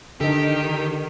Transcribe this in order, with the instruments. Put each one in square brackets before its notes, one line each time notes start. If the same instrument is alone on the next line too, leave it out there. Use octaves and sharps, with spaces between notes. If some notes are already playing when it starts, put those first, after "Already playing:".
[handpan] D3 [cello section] D#3 [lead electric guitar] G4 [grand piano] A4 D#5